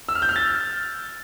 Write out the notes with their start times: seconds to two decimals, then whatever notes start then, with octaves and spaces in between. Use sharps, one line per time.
0.09 E6
0.15 F6
0.22 G6
0.29 F6
0.36 A6